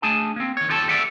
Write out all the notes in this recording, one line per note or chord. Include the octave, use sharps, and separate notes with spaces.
A3 D4 G#4 G#5 A5
A#3 C4
D#3 C#5
D#2 F4 G4 A4 E5 A5
G4 A4 D5 E5 F#5